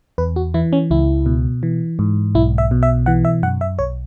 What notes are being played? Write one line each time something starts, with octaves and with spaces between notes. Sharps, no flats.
E2 B4
F#4
E3 E4
C#4
C#2 E4
B2
E3
G#2
B1 E4
E5
B2
E5
E3 F#5
E5
F#2 F#5
E5
B1 C#5